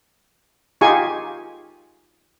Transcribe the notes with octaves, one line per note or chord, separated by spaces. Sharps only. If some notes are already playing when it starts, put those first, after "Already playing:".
D#4 F4 G4 G#4 G#5 C#6